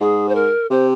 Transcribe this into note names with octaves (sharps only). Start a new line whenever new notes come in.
G#2 G#4
C5
A#4
C3 C5